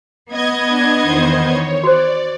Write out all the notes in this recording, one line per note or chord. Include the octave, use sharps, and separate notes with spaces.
B3 D#5 G#6
D4
E2 D#3 C5
C#5
F#4 C5 D5